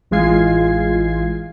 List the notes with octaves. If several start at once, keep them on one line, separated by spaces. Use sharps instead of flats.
A1 E3 G#3 F4 G#6 C7